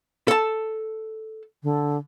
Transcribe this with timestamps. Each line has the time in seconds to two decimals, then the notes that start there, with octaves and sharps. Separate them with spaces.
0.28 A4 A5
1.63 D3